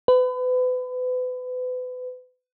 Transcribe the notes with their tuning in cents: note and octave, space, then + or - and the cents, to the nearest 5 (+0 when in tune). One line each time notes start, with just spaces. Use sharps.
B4 +35